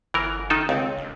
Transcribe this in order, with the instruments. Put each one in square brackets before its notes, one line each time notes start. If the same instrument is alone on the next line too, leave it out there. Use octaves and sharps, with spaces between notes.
[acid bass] G1 [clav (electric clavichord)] E3 A#4
[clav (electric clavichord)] D#3 D#4 A4
[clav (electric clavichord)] C#2 [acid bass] C4
[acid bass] E1